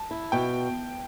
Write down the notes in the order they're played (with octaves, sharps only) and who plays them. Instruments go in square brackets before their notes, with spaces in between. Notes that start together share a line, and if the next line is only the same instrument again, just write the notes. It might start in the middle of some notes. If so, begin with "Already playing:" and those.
Already playing: [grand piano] A5
[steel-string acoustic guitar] E4
[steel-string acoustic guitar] B2 [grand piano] G5